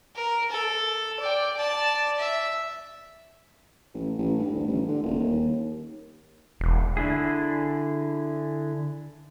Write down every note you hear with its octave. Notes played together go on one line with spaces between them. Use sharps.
A#4
A4
D5 G5
D5 A5
E5
A1
A1
G2
D2
A1
D3
D#1
D#2
E1
D3 D4 E4 G#4